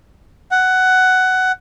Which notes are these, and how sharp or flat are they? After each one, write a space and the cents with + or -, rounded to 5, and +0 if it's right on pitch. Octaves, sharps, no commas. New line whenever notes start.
F#5 +10